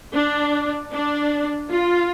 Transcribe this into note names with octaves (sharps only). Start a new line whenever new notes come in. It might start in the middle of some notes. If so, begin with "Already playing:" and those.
D4
D4
F4